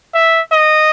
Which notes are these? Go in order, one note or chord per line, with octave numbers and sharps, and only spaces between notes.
E5
D#5